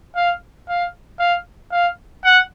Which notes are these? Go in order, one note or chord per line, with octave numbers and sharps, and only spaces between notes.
F5
F5
F5
F5
F#5